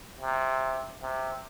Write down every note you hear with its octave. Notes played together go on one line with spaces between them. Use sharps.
C3
C3